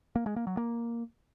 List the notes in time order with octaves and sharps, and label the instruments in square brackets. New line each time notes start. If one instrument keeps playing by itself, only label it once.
[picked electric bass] A#3
G#3
A#3
F#3
A#3